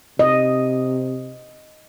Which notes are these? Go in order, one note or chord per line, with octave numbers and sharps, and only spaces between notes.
C3 D#5